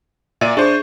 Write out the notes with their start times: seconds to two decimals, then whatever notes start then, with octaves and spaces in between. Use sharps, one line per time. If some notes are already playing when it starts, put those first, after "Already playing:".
0.41 A#2 D5 E5 D#7
0.57 D4 G#4 C5